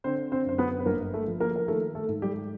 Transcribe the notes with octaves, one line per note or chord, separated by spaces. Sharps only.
D3 C4 C5
C4 C5
F#2 C5
B3 B4
B4
G1 A#3 A#4
A3 A4
F3
A#3 A#4
A#4
D#3 A3 A4
A3 A4
G#2
G3 G4